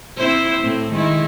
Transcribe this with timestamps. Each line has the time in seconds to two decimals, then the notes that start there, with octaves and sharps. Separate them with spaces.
0.17 C4 E4 C5
0.62 A2 C4
0.93 D#3 G#3 E4